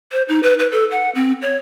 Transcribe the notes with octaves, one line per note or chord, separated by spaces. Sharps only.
C5
D#4
B4
B4
A4
F#5
C4
C#5